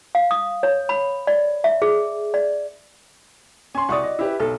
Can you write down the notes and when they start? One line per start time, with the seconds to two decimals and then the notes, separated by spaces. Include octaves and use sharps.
0.15 F5
0.31 D#6
0.63 C#5
0.89 B5
1.27 D5
1.64 E5
1.82 G#4
2.34 D5
3.75 C#4 G#5 C6
3.89 C2 F#4 D5 C#6 D#6
4.03 D#5
4.19 E4 G4 B4
4.40 B1 A4